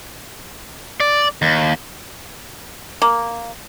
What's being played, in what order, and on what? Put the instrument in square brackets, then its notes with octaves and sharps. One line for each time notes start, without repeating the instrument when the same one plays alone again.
[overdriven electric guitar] D5
D#2
[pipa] A#3